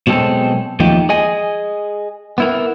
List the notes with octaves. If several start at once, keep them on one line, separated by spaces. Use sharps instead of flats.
B2 F#3 G#3 C4 A4
D#2 F3 A3 D#4 G4
G#4 D#5 G#5
B3 E4 A#4